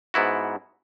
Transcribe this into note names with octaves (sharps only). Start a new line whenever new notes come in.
G#2 B3 E4 F#4